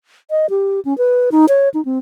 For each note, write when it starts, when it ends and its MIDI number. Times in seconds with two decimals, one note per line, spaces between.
0.31 0.46 75
0.50 0.80 67
0.85 0.96 61
0.98 1.30 71
1.32 1.46 63
1.49 1.69 73
1.74 1.84 63
1.85 1.99 60